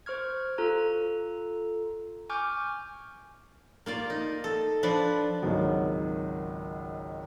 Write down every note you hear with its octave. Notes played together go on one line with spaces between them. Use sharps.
C5 C#6 F6 G#6
F4 A4 A#5
G#5 C#6 D6 F6 G6
A#3 F4 D5
D#4
A4
F3 D4 B4 D5
G#1 C#2 D#3 F#3